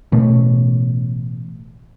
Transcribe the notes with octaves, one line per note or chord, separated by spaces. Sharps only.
A1 B2 A3 C#4